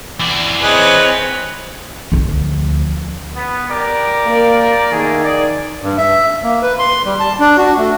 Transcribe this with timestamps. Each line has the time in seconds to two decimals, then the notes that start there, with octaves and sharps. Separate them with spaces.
0.20 E3 D5
0.63 C4 G#4 B4 C#5 D#5
2.12 D2 F3
3.36 B3
3.69 G4 A#4 D5
4.26 A#3
4.92 D#3 A3 A#3 G#4
5.23 G#4 D5
5.82 G2
5.98 E5
6.43 A#3
6.62 B4
6.79 C6
7.05 G3
7.20 A5
7.40 D4
7.57 F#4
7.77 A3